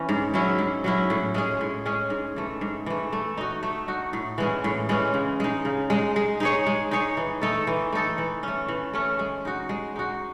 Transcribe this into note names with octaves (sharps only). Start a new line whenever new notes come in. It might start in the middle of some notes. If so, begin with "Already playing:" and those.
Already playing: E3 C#4
G#2
F#3 C#4 E4
G#2
F#3 C#4 E4
A2
G#3 C#4 G#4
A2
G#3 C#4 G#4
G#2
E3 A3
G#2
E3 A3
A3
D#4 F#4
A3
D#4 F#4
A2
E3 G#3 C#4
A2
E3 G#3 C#4
C#3
G#3 D#4
C#3
G#3 D#4
G#3
D#4 G#4 C#5
G#3
D#4 G#4 C#5
E3
A3 D#4 A4
E3
A3 D#4 A4
E3
A3 C#4
E3
A3 C#4
G#3
D#4 F#4
G#3
D#4 F#4